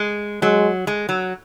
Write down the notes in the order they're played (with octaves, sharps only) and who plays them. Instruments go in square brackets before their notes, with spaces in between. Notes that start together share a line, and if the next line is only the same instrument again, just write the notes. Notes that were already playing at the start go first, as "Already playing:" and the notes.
Already playing: [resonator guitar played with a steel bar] G#3
[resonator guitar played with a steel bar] F#3 [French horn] G#3
[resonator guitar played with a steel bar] G#3
F#3